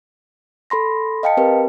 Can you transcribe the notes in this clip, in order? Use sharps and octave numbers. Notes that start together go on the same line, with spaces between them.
A4 B5 C6 A#6
D#5 F5 G5 A5 C#7
C4 G4 A#4 B4